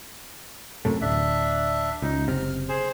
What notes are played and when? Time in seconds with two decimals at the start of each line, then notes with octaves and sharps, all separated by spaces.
0.85 F#2 C3 A3
1.01 D1 D4 E5
2.02 C#2 D#4
2.28 F#1 C3 F6
2.69 G#4 C5